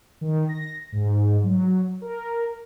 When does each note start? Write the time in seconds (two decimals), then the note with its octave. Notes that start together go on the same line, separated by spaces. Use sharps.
0.21 D#3
0.49 A#6
0.92 G#2
1.43 F#3
2.01 A#4